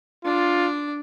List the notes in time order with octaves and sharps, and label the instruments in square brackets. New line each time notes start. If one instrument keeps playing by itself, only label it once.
[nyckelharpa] D4 [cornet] F4